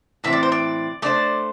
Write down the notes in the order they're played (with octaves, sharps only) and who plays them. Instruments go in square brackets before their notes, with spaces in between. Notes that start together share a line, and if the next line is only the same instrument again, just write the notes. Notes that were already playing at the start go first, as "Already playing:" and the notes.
[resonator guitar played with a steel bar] A2 E3 C4 E4 [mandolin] E5
[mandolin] D5
C5
D5
[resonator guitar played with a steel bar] A3 D4 C5 [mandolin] D5